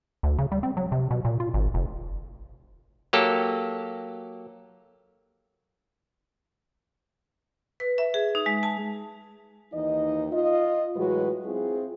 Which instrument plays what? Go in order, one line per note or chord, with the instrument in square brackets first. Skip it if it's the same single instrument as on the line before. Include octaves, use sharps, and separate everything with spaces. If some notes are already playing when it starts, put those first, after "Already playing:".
[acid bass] D2
C#3
G3
C4
F#3
C3
B2
A#2
F4
G#1
F1
[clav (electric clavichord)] F#3 A#3 G4 A4
[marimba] B4
E5
G#4
D#4
G#3
A5
[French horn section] D#2 E3 D#4 D#5
F4 D#5
A2 E3 F#3 G#3 F#4 B4
C4 E4 F4 G#4